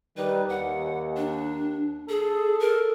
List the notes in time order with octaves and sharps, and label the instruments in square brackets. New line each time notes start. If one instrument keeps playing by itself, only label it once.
[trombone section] D#3 G3 [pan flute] B4
[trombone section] D#2 [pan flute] F#5
[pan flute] D4
[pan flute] G#4 [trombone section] A4
[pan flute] A#4